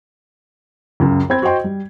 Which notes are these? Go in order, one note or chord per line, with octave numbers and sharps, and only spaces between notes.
C#2 F#2 C#3
C4 B5 G#6
F#4 C5 D#5 G5 C6
G3